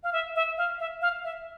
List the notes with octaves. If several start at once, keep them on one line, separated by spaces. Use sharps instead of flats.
F5
E5
E5
F5
E5
F5
E5